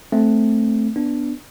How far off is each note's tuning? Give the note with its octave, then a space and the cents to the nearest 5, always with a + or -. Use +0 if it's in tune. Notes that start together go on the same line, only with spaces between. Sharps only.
A3 +0 C4 +0
B3 +0 D4 +0